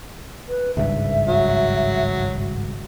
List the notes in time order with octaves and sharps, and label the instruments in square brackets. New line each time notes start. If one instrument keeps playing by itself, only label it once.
[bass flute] B4
[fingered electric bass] G#1 C#2 G2 [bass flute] E5
[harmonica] F#3